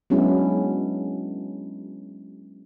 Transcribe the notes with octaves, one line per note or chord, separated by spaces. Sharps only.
F#3 G#3 B3 C#4 D4 E4